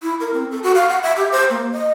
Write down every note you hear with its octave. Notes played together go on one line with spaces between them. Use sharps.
E4
A#4
C4
A4
F#4
F5
F#5
E5
G4
C5
A#3
D#5